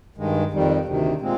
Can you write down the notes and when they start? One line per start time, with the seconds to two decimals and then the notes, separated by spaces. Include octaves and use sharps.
0.16 G2 D#3 G#3
0.51 F2 D#3 G3
0.86 D2 C3 D#3
1.21 A#2 G#3 C4